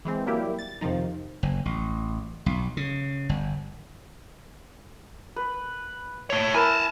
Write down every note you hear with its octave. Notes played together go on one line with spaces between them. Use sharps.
E3 G#3 C4
F#3 G3 A#3 E4 G4
A6
F2 C3 D#3 F3 D#4
F#1
A1
B1
C#3
G1
B4
A3 C#5
E4 A#4 B4 G#5 A5